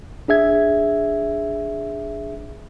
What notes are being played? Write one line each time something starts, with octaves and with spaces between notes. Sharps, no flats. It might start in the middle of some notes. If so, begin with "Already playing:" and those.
D4 G#4 E5 G#6